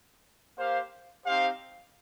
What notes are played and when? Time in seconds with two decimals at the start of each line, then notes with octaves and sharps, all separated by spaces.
0.58 A#3 G4 C5 F5
1.26 C4 D#4 G4 C5 F5